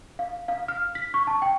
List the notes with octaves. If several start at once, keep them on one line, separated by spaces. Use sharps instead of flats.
F5
F5
F6
B6
C#6
A5
G5